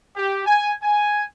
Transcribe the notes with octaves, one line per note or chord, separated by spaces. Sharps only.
G4
G#5
G#5